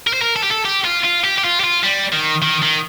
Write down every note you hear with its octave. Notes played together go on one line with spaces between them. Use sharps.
A#4
C5
A#4
A4
G4
A4
G4
F4
F4
G4
G4
F4
G4
F4
G3
D#3
D#3
D#3